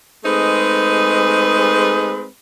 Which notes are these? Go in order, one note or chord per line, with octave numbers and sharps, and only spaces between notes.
G#3 A3 C4 D#4 G#4 B4